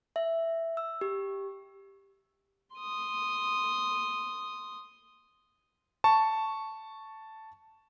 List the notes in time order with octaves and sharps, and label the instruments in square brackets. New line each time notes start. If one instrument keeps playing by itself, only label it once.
[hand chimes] E5
E6
G4
[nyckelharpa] C6 D#6
[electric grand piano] A5 C#6